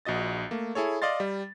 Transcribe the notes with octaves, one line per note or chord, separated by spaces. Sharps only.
A#1 F#4 D#5 A6
A3 A#3
E4 G#4 A4 C#5
D5 D#5 F5 C6 A6
G3